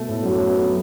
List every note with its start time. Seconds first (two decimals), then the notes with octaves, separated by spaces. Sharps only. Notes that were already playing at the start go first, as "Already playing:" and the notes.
Already playing: B2 A3
0.09 A2
0.23 F#2 F#3
0.35 A3
0.47 B3
0.59 B3